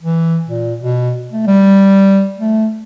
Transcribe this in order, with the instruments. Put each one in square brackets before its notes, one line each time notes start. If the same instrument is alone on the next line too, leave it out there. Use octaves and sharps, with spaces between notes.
[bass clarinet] E3
A#2
B2
A3
G3
A3